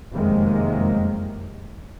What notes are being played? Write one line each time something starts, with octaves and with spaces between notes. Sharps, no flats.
F1 F#2 C3 D#3 G#3 A#3